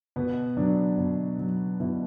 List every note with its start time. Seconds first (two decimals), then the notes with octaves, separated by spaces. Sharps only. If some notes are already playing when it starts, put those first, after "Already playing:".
0.16 B2 B3
0.57 F#3 D4
0.98 B2
1.39 F#3
1.80 B2 E4